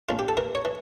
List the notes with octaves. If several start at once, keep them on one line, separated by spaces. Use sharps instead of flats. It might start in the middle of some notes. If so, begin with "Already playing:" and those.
A#1 F4
G4
A4
E3 A#4
C#5
E3